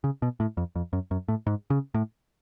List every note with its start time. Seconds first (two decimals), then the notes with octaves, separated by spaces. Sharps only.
0.04 C#3
0.22 B2
0.40 A2
0.57 F2
0.76 F2
0.93 F#2
1.11 F#2
1.28 A2
1.47 G#2
1.70 C#3
1.94 A2